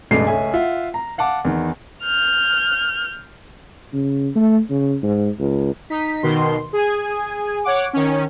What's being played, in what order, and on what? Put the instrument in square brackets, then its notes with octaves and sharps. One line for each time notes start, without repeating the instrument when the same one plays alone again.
[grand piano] E1 C#2 G2 G#3 A3 C7
C#2 A3 C#4 E5 G#5
F4 E5 F#5
A#5
F5 F#5 A5 D6
E2 D#3
[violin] F6 G6
[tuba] C#3
A3
C#3
G#2
C#2
[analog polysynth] D#4 B6
B2 D#3 C6
G#4 G#5
C#5 F#5 D6
D#3 C#4